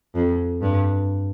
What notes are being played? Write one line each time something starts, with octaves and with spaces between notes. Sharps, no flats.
F2
G2